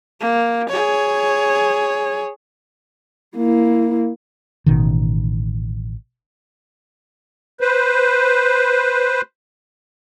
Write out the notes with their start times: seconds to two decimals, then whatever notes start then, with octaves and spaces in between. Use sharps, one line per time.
0.21 A#3
0.69 G#4 C#5
3.36 A#3 E4
4.66 A1 B2 D#3
7.61 B4 C5